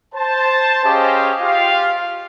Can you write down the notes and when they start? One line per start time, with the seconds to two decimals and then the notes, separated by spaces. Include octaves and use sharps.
0.14 C5 A5
0.85 C#4 G4 G#4 C5 D#5 F5
1.41 F4 G4 F5